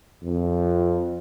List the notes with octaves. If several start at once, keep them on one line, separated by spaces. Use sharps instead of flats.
F2